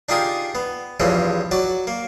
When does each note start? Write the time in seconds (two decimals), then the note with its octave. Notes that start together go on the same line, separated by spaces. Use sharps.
0.09 D4 D#4 F4 G4 G#4 A#4
0.55 B3
1.00 E2 G2 E3 F3 G#3 C#4
1.51 F#3 F#4 D5
1.87 A#3